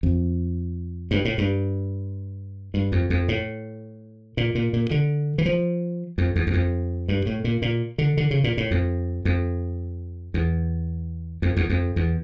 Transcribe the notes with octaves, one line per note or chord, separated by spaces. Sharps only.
F2
G2
A2
G2
G2
F2
F2
A2
A#2
A#2
A#2
D3
E3
F3
F2
E2
E2
F2
G2
A2
A#2
A#2
D3
D3
C#3
A#2
A2
F2
F2
E2
F2
E2
F2
E2